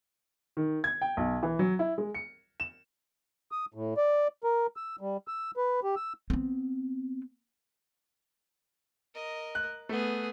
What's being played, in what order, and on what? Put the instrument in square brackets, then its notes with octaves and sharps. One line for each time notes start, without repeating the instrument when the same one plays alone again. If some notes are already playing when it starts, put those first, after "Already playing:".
[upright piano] D#3
G#6
G5
B1
E3
F#3
E4
G#3
C#7
E7
[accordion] D#6
A2
D5
A#4
E6
G3
E6
B4
G4
E6
[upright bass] B3 C4
[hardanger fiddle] A#4 D#5
[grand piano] F#6
[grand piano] A3 [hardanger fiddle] B3 G#4